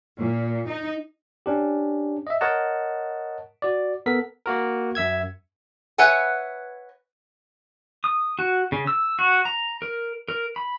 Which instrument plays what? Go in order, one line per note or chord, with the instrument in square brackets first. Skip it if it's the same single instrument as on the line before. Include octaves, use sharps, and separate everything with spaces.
[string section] A#2
D#4
[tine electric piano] C#4 D4 G4
D#5 E5
A#4 C#5 D#5 F#5 A5
F#4 D5
B3 A4 A#4 B6
A#3 F#4 A#4
F#2 E5 E6 G#6
[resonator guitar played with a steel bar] B4 C#5 E5 F#5 G#5
[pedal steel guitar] D#6
F#4
C#3
E6
F#4
A#5
A#4
A#4
B5